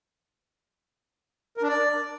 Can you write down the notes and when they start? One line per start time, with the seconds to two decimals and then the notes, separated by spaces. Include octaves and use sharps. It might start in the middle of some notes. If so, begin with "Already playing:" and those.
1.57 A#4
1.63 D4
1.68 D5